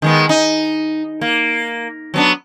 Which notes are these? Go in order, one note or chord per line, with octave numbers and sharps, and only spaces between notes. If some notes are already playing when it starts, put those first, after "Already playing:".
D#3 G#3 B3
D#4
A#3
F#3 B3 D4